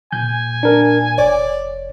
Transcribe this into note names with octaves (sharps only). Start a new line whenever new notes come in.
A#2 G#5 G6
D4 A#4
F1 C#5 D5